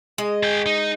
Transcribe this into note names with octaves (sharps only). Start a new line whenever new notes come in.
G#3 D#5
G#4 G5
D#4